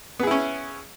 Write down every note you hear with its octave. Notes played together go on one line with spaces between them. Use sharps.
B3 C#4 E4 G#4